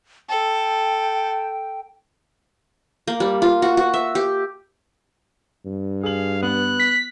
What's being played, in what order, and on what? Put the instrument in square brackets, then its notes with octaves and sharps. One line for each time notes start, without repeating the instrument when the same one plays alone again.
[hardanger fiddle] A4 [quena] G5
[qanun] A#3
G3
F4
F#4
F#4
E5
G4
[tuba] G2
[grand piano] G#4 F#7 [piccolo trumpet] F5
[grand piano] B3 [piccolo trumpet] F#6
[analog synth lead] B6